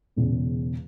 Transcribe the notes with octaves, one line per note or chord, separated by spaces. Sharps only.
E1 E2 C#3